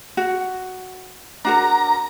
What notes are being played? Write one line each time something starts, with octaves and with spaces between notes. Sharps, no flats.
F#4
D4 F#4 A#4 A#5